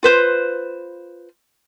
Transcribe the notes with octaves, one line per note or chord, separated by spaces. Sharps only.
F4 B4 C5